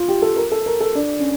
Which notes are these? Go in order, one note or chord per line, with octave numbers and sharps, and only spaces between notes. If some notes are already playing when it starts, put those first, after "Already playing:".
Already playing: F4
G4
A4
A#4
A4
A#4
A4
D4
C#4